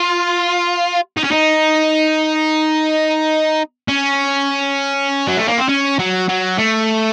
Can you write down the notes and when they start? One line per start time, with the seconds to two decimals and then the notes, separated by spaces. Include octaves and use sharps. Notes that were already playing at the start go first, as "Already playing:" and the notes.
Already playing: F4
1.17 D#4
1.24 C#4
1.31 D#4
3.88 C#4
5.28 F#3
5.37 A3
5.48 A#3
5.58 C4
5.69 C#4
5.99 F#3
6.29 F#3
6.58 A3